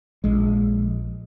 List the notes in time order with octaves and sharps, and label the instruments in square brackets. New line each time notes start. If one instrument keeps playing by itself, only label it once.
[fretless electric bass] A#1 G#3